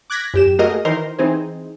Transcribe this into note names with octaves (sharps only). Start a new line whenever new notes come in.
D6 F#6 G#6 A#6 B6
F#2 G4 E7
A3 A#3 F#4 G#4 A#4 D#5
D#3 E3 D#4 A#4 C5
E3 C4 D#4 G#4 C5